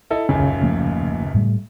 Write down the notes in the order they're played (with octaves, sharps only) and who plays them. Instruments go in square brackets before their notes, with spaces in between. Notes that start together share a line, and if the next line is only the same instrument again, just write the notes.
[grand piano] E4 A4 D#5
[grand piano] D#1 C#2 F#2 [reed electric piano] C#3
[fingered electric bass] F3 A3 A#3
A2 G3 A3